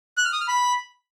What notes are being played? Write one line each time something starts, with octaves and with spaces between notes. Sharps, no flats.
F#6
F6
D#6
F6
B5